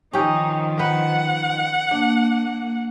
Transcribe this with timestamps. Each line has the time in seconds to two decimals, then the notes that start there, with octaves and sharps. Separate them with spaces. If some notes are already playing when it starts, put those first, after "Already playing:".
0.13 D#3 F3 C#4 D#4 G4
0.79 D#4 B4 F#5
1.91 A#3 D4